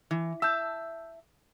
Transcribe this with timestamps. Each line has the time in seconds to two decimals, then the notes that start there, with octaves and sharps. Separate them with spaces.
0.11 E3
0.42 E5 A5 E6 G6